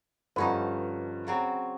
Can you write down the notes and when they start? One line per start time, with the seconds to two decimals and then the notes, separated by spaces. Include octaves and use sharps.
0.36 G2 D3 F3 G3 C#4 D#4 B4
1.27 C#3 F#3 C4